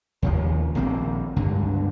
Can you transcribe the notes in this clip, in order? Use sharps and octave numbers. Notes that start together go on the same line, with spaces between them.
D#2 C#3 F3
A#1 D#3 A#3 C4
C#2 G2 D3